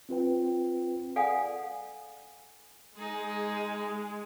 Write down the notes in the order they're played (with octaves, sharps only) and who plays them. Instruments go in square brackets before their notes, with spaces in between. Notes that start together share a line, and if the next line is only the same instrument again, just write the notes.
[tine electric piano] C4 F4 B4 G5
[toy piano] A4 D5 F5 F#5 G#5 D#6
[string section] G#3 [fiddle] D#4 G#4